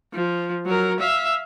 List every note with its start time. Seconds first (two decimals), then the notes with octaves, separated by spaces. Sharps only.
0.13 F3
0.66 F#3 A#4
1.00 E5 F5